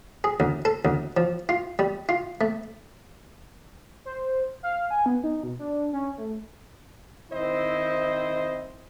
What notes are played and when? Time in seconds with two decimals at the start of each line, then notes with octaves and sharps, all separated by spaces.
0.24 G#4
0.40 D2
0.65 A4
0.85 D2
1.17 F3
1.49 F4
1.79 G3
2.09 F4
2.41 A3
4.05 C5
4.63 F5
4.91 G#5
5.06 B3
5.24 D#4
5.43 B2
5.59 D4
5.93 C#4
6.18 A3
7.32 D#3 C4 E4 C5 D#5